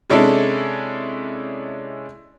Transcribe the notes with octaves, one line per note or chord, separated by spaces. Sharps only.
C3 G#3 C#4 D4 E4 A4